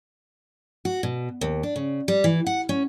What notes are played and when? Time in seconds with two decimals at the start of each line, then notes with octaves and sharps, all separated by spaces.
0.85 F#4
1.03 B2
1.41 D#2
1.63 D4
1.76 C#3
2.08 G3
2.24 E3
2.47 F#5
2.69 C#4